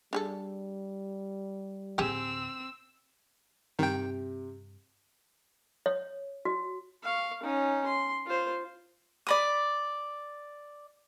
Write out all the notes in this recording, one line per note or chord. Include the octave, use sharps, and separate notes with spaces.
G3 D4 G#4 A4
D2 A2 C4 G4 G#4 E6
G2 C3 D#3 G5
C#5
F#4
F5 C#6
C#4 D#4
C6
F4 C5
D5 B5 D#6